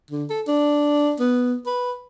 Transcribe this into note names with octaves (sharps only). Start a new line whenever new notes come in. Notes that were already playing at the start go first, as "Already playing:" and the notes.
D3
A4
D4
B3
B4